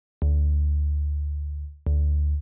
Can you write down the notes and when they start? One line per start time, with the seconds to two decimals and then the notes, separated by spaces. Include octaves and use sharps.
0.22 D2
1.87 D2